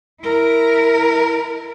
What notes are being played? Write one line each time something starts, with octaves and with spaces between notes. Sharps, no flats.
E4 A#4